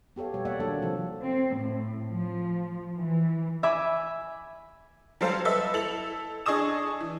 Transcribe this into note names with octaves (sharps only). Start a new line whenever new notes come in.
B3 G4 A4 C#5 F5
B2 G3 C#5
A#3 C#5 D5 E5 F#5
D#3 F#3 A#3 D4 A4 C#5
C3 F3 C4
C4
A2
F3
E3
E5 G#5 B5 D6
F#3 G3 A4 C5 F5
A4 B4 D#5 E5
E4 A4 F7 F#7
D4 G#4 D#5 C#6 D#6 E7
E3